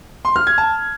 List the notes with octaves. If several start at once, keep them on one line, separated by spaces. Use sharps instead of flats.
C6
F6
G#6
A5